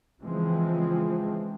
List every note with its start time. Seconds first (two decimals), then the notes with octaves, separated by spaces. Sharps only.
0.21 C#3 E3 F3 G#3 C4